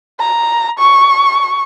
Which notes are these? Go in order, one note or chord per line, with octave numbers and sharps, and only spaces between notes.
A#5
C#6